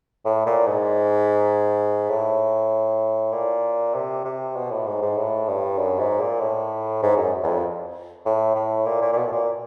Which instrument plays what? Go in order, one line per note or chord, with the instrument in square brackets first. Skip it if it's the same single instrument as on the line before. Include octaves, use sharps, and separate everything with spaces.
[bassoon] A2
A#2
G#2
A2
A#2
C3
C3
B2
A2
G#2
G#2
A2
G2
F#2
G#2
A#2
A2
G#2
F#2
E2
F2
A2
A2
A#2
A#2
A#2
B2
A2
A#2